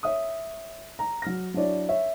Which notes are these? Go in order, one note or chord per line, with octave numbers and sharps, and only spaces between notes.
C#5 E5 D#6
A#5
F#3 F6 A#6
F#3 D4 E4 C#5 D5
C#5 E5